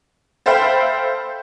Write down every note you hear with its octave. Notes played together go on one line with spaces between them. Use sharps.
A4 C5 E5 F5 G5 B5